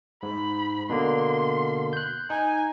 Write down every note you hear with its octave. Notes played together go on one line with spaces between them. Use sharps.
G#2 B5
B2 D3 A#3 C6
F#6 G6
D#4 G#5